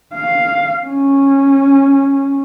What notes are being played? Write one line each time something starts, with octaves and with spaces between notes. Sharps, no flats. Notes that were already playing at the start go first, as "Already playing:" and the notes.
F5
C#4